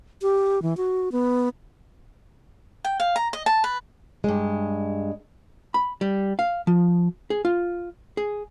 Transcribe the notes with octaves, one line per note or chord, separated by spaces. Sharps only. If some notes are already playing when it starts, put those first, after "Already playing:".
G4
E3
F#4
B3
G5
F5
A#5
D#5
A5
B4
G2 G#3
B5
G3
F5
F3
G#4
F4
G#4